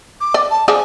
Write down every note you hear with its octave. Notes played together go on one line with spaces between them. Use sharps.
D6
D5
A5
F3 G#4 D5 G#5